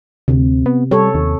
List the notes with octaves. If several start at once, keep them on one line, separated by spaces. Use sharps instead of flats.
D2 C3
B3
G3 A4 C#5
D#2